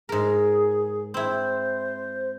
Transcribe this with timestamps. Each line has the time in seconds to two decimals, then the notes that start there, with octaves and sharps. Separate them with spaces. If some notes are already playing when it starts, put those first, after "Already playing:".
0.09 G#2 G#4 A#4
1.14 C4 E4 C5